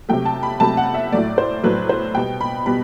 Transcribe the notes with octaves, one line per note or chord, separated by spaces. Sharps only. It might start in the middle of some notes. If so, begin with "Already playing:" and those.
C3 F#3 A3 G5
A5
B5
C3 F#3 A3 A5
F#5
E5
A2 F#3 A3 D5
C5
A2 F#3 A3 B4
C5
B2 G3 B3 G5
B5
B2 G3 B3 B5